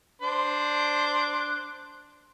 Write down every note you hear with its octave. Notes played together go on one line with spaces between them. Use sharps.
D4 C5